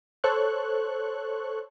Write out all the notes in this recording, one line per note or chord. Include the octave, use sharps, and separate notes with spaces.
A4 C5 C#5 C#6 F#6